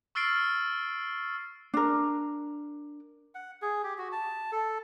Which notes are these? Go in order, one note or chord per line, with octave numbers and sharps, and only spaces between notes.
C#6 E6 F6 A6 C7 D7
D4 A#4
F#5
G#4
G4
F#4
A5
A4